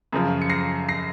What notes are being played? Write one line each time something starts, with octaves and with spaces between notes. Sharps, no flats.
F#2 C#3 F3
C#7
A#6 C7
A#6 C7